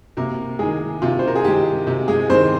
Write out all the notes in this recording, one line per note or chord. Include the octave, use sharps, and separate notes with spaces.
C3 A#3 A#4
D#3 G#3 G#4
C3 F4
C5
A#4
G#4
D#3 G#3 G4
C3 G4
G#3 G#4
D#3 G#3 C4 C5